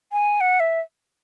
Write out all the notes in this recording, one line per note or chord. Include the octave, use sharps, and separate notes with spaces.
G#5
F#5
E5